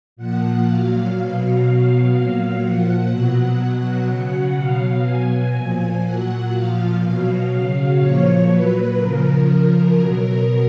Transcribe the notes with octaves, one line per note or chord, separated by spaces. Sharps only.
A#2 F3 F#5
A#2 F#3 F5
B2 F#3
B2 F#3 F5
A#2 F#3 F5
A#2 F3 F#5
B2 F#3 F#5
B2 F#3
C#3 F#3
B2 F#3 F5
B2 F#3 G#5
A#2 F3
A#2 F#3 F#5
A#2 F3 F5
B2 F#3
C#3 F#3
A#2 F3 C#5
A#2 F#3 B4
C#3 F3 A#4
C#3 F3
B2 F#3